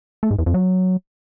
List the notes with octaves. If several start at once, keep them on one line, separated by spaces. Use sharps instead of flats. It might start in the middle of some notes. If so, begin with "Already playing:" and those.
A3
G#2
E2
F2
F#3